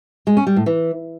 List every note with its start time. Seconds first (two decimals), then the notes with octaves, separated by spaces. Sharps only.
0.27 G#3
0.37 C#4
0.47 G3
0.56 A2
0.66 E3